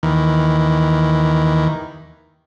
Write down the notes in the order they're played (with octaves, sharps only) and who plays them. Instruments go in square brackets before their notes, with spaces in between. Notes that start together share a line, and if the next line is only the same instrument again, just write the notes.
[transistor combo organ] D#2 D#3 E3